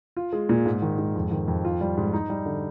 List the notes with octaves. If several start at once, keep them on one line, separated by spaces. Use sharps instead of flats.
F4
G#3
A#2
G#2
D#3
G#2
F2
D#3
F2
F4
G3
G#2
D#4
G3
D3